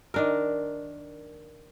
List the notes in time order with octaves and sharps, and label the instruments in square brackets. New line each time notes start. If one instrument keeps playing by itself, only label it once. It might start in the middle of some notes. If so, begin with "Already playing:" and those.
[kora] D#3 D4 A#4